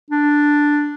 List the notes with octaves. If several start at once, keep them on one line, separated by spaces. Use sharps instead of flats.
D4